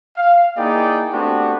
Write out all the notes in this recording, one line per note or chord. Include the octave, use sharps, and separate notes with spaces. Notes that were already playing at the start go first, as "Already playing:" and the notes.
F5
A#3 D#4 E4 G#4 D5 G5
A3 B3 C4 D4 F#4 G4